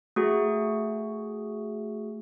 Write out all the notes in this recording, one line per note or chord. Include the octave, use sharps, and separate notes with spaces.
A3 F#4 G#4